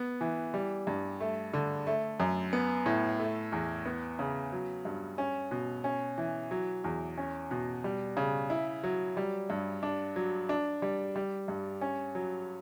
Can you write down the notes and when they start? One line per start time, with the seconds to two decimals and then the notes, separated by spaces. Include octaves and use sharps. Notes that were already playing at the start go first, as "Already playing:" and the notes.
Already playing: B3
0.21 E3
0.54 G3
0.87 G2
1.20 A3
1.53 D3
1.87 A3
2.20 F#2
2.53 B3
2.86 A2
3.20 A3
3.52 E2
3.86 B3
4.19 C#3
4.52 F#3
4.85 G2
5.18 C#4
5.51 B2
5.84 C#4
6.18 E3
6.51 F#3
6.84 E2
7.18 C#4
7.51 B2
7.84 G3
8.17 C#3
8.50 E4
8.84 F#3
9.17 G3
9.50 G2
9.83 D4
10.16 F#3
10.49 D4
10.82 G3
11.16 G3
11.48 G2
11.81 C#4
12.15 F#3